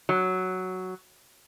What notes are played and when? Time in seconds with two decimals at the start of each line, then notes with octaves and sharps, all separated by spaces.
0.09 F#3